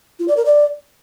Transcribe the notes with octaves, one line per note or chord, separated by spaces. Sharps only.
F4
D5
A#4
D5